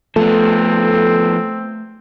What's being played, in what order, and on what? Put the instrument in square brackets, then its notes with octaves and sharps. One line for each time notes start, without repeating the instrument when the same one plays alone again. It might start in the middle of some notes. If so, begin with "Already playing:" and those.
[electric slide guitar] F3 B3 [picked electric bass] A3 [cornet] C4 [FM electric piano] A4